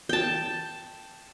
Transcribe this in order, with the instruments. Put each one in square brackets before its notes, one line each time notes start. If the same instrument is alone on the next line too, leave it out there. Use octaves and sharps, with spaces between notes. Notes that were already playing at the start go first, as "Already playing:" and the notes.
[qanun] G5 A5